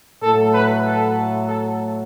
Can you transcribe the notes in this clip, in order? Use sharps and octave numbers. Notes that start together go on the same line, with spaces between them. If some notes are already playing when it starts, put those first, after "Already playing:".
A2 F#3 A3 A4
B4
A4
A4